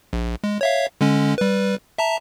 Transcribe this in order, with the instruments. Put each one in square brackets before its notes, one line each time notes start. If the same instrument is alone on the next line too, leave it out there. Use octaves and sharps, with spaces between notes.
[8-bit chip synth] A#1
G#3
C#5 E5 F5
D3 G#3 C#4
G3 B4
E5 A5 A#5